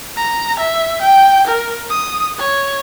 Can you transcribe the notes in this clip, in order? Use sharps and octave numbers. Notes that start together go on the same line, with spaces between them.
A#5
E5
G5
A#4
D#6
C#5